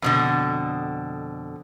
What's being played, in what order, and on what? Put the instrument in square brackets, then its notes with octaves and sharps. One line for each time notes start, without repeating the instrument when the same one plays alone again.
[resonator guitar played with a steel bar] F2 B2 D3